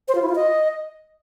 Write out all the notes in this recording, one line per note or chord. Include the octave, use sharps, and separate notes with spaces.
C5
F4
E4
F4
D#5